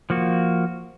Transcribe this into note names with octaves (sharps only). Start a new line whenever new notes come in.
F3 A#3 F#4